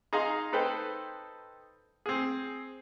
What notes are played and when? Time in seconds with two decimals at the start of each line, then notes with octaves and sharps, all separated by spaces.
0.13 D#4 G#4 F5 A#5 C6
0.53 D#4 A4 B4 C5 G5
2.06 C4 G#4